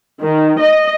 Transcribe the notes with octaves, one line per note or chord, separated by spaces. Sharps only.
D#3
D#5